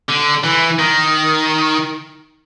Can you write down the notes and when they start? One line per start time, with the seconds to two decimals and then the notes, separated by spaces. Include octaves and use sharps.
0.09 D3
0.44 E3
0.79 D#3